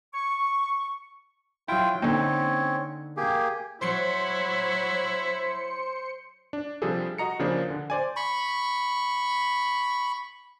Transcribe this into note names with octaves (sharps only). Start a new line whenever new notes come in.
C#6
F#3 E4 F4 G5
D3 A#3 C4 C#4 D#4
A#3 G4 G#4
F#3 E4 C5 C6 C#7
D4
C3 F3 G3 D4 G#4 A4
F#4 D#5 A#5 C#7
C#3 F3 A#3 D4 G#4
D3
C5 D5 G#5
B5 C#6